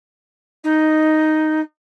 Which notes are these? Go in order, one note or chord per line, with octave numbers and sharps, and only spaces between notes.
D#4